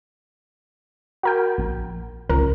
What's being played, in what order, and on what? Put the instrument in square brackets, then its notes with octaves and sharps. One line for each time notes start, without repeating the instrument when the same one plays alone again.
[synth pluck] F#4 A#4 G5
A#1
[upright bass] C#2 [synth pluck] A#4